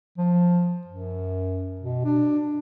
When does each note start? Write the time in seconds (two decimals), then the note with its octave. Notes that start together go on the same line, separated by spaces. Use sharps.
0.18 F3
0.87 F#2
1.81 B2
2.04 D4